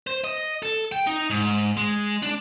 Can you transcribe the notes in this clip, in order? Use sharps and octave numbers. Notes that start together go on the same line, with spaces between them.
C5
D#5
A4
G5
D#4
G#2
G#3
D4